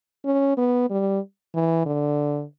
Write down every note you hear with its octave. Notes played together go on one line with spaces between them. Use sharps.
C#4
B3
G3
E3
D3